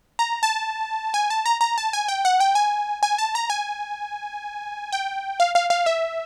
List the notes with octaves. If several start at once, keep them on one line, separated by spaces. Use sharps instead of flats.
A#5
A5
G#5
A5
A#5
A#5
A5
G#5
G5
F#5
G5
G#5
G#5
A5
A#5
G#5
G5
F5
F5
F5
E5